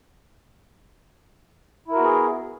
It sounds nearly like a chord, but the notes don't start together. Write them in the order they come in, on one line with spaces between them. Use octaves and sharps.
E4 A#4 F#4 B3 G#4